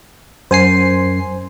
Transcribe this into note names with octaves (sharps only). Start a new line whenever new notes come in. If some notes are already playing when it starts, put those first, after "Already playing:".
F#2 C5 G#5 C7